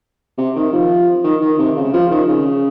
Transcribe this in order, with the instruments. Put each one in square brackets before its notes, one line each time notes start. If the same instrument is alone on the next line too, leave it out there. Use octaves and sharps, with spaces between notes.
[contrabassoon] C3
D#3
F3
D#3
D#3
C3
C#3
F3
D#3
C#3